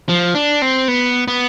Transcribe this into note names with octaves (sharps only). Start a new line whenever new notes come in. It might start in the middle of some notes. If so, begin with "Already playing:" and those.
F3
D4
C4
B3
B3